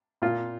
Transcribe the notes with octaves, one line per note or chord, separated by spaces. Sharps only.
A#2 F4